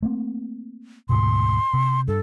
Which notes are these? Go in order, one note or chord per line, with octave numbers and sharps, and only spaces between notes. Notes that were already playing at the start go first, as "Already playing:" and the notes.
A3 A#3 C4
D2 G#2 B2 C6
C3
G2 A4